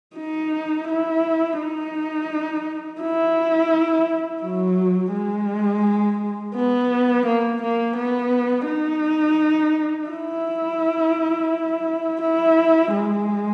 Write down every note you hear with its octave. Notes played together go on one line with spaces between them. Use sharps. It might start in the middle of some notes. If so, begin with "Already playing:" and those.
D#4
E4
D#4
E4
F#3
G#3
B3
A#3
A#3
B3
D#4
E4
E4
G#3